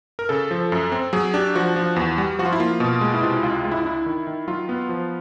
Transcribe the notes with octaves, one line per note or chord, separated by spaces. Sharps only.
A#4
C#3 A4
F3
F#2
C4
F#3 G#4
D4 G4
F3 F#4
F3
E2
G3
F3 F#4
F4
E4
A#3 F4
B2
G#3
E4
C3 F4
E4
C#2 F4
G#3 F4
E4
D4 E4
D#3
D#3
F#3 F4
B3
F3